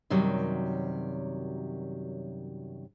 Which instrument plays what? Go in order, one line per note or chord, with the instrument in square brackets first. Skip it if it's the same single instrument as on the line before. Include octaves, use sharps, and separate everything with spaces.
[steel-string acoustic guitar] F#2 C3 D#3 F#3 G3